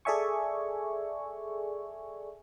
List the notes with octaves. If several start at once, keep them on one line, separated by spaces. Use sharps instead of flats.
G#4 A4 D5 E5 G#5 C#6